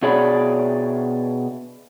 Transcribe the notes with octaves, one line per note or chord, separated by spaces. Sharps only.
B2 G#4 C#5 D5 B5